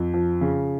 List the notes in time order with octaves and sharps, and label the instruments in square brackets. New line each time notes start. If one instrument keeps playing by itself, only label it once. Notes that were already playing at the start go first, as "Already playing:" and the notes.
Already playing: [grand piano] F2
F3
C#3